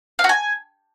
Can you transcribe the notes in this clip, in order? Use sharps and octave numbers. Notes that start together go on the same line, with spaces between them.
F5
F#4
G#5